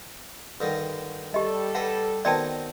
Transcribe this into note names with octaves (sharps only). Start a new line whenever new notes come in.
G2 D3 D#3
G3 G4 A4 D#5
B4 F#5 A#5
B2 D#3 C4 D5 G5 A5